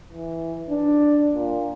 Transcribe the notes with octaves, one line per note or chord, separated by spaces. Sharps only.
E3
D4
A#2